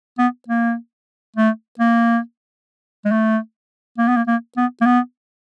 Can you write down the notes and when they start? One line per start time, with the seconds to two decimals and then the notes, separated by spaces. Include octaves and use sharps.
0.18 B3
0.48 A#3
1.36 A3
1.79 A#3
3.05 G#3
3.11 A3
3.98 A#3
4.08 B3
4.17 A#3
4.27 A#3
4.57 B3
4.81 A#3
4.86 B3